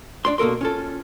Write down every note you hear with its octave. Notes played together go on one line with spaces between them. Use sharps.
D4 D5 C6
B2 A#3 A4 A#4 C6
C#4 F4 A4